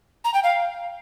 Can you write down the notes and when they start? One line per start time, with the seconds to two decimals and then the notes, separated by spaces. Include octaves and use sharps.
0.24 A#5
0.34 G5
0.43 F5